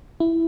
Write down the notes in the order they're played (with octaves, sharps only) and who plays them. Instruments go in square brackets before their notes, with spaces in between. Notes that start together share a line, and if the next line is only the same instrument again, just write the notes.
[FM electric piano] E4